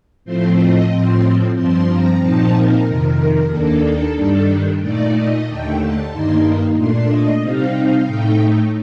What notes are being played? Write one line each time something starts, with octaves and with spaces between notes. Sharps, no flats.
A2 F3 A3 C4 C5
D#5
A2 F3 C4 C6
G2 F3 C4 C6
A#5
A#2 F3 C4 D#4 A5
A#4
F2 C3 D#3
D#2 D#3 A#3 D4 A4
A4
G2 D#3 G3 D4 A4
A#2 A3 D#4 D5
D#5
D#2 D3 A3 G5
A5
G2 D#3 A#3 D#4 C6
A#2 A3 D4 C6
D#5
C3 G3 C4 D#4 F5
F5
A2 A3 D#4 G5